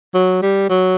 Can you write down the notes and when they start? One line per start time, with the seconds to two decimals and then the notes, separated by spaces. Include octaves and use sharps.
0.14 F#3
0.42 G3
0.70 F#3